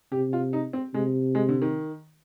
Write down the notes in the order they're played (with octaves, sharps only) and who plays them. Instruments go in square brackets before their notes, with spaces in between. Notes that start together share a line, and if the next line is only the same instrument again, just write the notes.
[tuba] C3 [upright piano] G4
[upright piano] F4
D#4
C4
[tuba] C3 [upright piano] G#3
[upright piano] G#3
D3
D#3